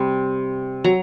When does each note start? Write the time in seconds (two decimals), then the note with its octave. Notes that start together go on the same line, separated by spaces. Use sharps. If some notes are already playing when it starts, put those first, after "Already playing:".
Already playing: C3 G3 C4
0.84 F#3 A#5